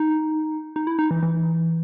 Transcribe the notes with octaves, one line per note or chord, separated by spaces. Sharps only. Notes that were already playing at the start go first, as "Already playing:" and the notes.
Already playing: D#4
D#4
E4
D#4
E3
E3